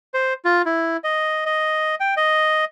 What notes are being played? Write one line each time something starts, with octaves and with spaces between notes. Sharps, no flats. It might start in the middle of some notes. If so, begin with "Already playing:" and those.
C5
F4
E4
D#5
D#5
G5
D#5